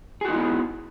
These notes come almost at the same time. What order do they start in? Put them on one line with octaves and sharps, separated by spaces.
G#4 F#4 D#4 E4 B3